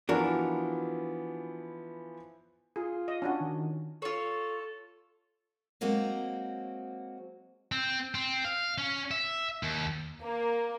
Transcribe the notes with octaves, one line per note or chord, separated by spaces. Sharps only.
E3 F3 B3 D4 F#4 A#4
F4 G#4
D#5
C#4 D4 F#4
D#3
F4 A4 C#5
F#3 G#3 A#3 C4 F#4
C4
C4
F5
C#4
E5
D#2
A#3